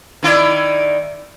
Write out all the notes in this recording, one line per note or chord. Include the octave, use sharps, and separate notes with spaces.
D#3 E4 D5